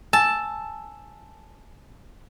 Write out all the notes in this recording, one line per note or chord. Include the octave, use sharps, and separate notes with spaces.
G#5 A5 E6